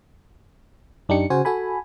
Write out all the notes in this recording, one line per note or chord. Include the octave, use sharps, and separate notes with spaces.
F#2 D4 D#4 G4 C#7
C#3 F#4 C5 G#5
F#4 A4 G#5 B5